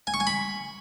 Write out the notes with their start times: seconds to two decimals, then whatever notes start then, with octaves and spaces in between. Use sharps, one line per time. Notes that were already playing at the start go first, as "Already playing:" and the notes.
0.07 G#5
0.14 C#6
0.20 G#5
0.27 B5